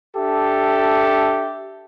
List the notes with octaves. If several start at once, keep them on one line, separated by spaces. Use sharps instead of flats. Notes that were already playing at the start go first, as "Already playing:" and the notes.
D4 G4 A4 E5